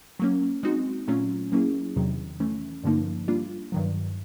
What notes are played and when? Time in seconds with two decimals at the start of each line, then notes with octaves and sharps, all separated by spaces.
0.19 F#3 A#3 C#4
0.63 G#3 C4 D#4 F#4
1.08 A#2 F#3 A3 C#4 F4
1.52 F#3 A#3 C#4 E4 G#4
1.96 E2 C3 D#3 F#3
2.40 E3 A3 C#4
2.83 G2 D3 F3 A#3 D#4
3.28 G3 A#3 D4 F4
3.72 G2 D#3 F#3